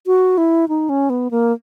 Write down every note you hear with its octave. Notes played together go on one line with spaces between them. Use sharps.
F#4
E4
D#4
C#4
B3
A#3